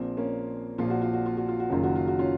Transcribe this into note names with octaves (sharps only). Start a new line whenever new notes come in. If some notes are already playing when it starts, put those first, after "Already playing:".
Already playing: A#1 A#2 F3 C4
A#3 C#4
A#1 A#2 F3 F4
F#4
F4
F#4
F4
F#4
F4
F#4
F#1 F#2 D#3 F4
F#4
F4
F#4
C#4 F4